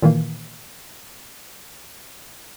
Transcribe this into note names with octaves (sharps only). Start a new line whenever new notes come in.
A#2 D#3 E3 A#3